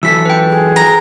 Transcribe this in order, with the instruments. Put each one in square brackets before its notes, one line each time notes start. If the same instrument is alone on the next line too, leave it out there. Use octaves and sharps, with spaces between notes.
[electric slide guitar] E3 F#3 A4 [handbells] E6 B6
[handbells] B4 G5
[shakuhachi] G#4
[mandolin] A#5